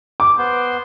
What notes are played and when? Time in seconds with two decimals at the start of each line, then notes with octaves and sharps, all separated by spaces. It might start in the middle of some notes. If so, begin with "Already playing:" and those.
0.20 D6
0.38 B3 C5